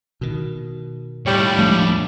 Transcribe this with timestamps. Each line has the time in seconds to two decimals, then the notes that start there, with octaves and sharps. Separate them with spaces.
0.21 B2 D#3
1.26 D#2 A2 G3 C#5
1.59 F3 G#3 A3 D4 E4 C#5